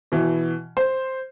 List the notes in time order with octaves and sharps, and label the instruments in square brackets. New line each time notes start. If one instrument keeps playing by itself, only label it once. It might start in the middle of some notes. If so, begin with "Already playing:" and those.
[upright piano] B2 E3
C5